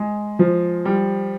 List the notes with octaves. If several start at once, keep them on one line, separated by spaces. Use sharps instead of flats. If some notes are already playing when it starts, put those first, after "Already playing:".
Already playing: G#3
F3
G3